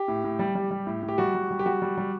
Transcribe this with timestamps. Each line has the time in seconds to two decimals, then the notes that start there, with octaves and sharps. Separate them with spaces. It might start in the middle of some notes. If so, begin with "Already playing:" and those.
Already playing: G4
0.08 A2
0.24 A2
0.39 G3
0.55 G3
0.71 G3
0.87 A2
1.03 A2
1.09 G4
1.18 G3 F#4
1.35 G3
1.51 G3
1.59 G4
1.66 G3 F#4
1.82 G3
1.98 G3